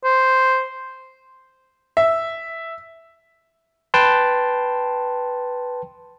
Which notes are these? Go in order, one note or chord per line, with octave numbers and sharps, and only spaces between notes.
C5
E5
B4 G5 A5 C6